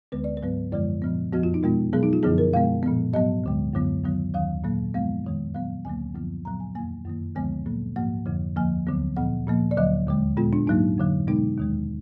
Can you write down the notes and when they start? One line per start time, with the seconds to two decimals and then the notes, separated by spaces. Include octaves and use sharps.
0.12 D2 D3 G#3 B3 B4
0.24 D5
0.37 B4
0.42 G#2 F#3 B3
0.72 F#2 D3 F3 G#3 D5
1.02 A#2 F3 B3
1.32 F2 F3 B3 F#4
1.43 F4
1.54 D#4
1.63 B2 G#3 B3 F4
1.93 B2 F#3 B3 G#4
2.03 D#4
2.13 F4
2.23 F#2 D3 F3 B3 G#4
2.38 A#4
2.53 B2 G#3 B3 F5
2.83 A#2 F3 B3
3.13 G#2 F#3 B3 D#5
3.44 D2 D3 G#3
3.74 F#2 D3 F#3 B3
4.03 F#2 D#3 F#3 B3
4.34 D#2 D#3 F#3 F5
4.64 A#2 F#3 A#3
4.94 F#2 F3 G#3 B3 F5
5.24 F2 D#3 G#3
5.54 A#2 F#3 B3 F5
5.85 D2 D3 F#3 A#3 G#5
6.15 F#2 D3 F3 B3
6.45 A#2 F#3 B3 A#5
6.60 G#5
6.75 F2 D#3 A#3 G#5
7.06 F#2 D#3 A#3
7.35 D2 D3 F3 G#3 B3 G#5
7.66 A#2 F#3 A#3
7.96 G#2 F3 A#3 F#5
8.26 F2 D3 F3
8.56 D#2 D3 F3 A#3 G#5
8.87 D2 D3 F#3 B3
9.17 A#2 F3 B3 F#5
9.47 A#2 F3 A#3
9.71 D5
9.77 D2 D3 F#3 D#5
10.07 D#2 D3 G#3
10.37 A#2 G#3 B3 F4
10.53 D4
10.67 G#2 F#3 A#3 D#4
10.98 F2 D3 F#3
11.27 B2 G#3 B3 D#4
11.58 D#2 D#3 G#3